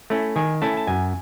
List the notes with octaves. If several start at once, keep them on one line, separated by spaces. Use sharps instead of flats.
A3 C#4 E4
D#3 G#5
A3 C#4 E4 A5
A5
F#2 G#5